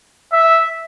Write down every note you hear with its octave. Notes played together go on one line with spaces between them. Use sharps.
E5